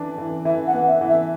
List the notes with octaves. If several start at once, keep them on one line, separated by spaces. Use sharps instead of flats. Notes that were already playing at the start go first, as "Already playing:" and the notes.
Already playing: E3 D4
E3
E3 E5
F#5
B3
E5
E3
E5